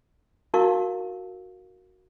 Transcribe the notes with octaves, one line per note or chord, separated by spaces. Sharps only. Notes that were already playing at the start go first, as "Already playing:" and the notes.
D#4 E4 F#4 A#4 F5 C#6